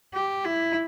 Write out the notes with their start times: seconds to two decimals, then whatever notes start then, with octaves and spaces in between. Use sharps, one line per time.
0.14 G4
0.45 E4